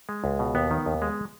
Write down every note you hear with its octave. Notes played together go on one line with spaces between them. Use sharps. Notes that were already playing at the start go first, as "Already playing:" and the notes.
G#3
C#2
B2
D#2 B3
D#3
D#2
G#3